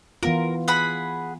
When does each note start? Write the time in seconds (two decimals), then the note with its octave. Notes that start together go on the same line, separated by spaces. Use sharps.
0.23 E3 B3 F4 A#4
0.68 G#4 F#5 B5